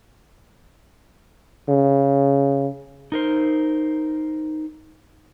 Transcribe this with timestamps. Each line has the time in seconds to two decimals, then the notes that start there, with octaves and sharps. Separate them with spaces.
1.69 C#3
3.12 D#4 A#4 C5